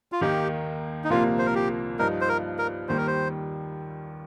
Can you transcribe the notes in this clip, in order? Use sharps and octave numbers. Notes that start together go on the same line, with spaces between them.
F4
D#2 D#3 A#3 D#4 G4
D#4
C2 A#2 F3 A#3 F4
C5
A#4
G4
G2 F3 D#4 A#4
C5
A#4
A#4
D#2 D#3 G3 C5
A#4
C5